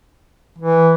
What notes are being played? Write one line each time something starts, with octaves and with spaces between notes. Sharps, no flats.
E3